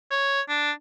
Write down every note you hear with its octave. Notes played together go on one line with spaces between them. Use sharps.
C#5
D4